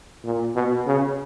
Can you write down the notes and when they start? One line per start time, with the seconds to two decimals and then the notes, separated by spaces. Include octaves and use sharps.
0.24 A#2
0.55 B2
0.86 C#3